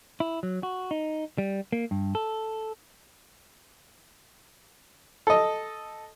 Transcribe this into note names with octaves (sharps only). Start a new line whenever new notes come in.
E4
F#3
F#4
D#4
G3
A#3
G2
A4
A4 D#5